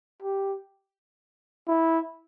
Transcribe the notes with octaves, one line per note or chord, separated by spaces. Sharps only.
G4
E4